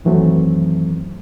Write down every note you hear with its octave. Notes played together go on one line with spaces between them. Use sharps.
F#2 D#3 E3 F#3 A3 C4